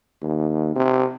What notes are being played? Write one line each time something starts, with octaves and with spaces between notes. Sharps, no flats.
D#2
C3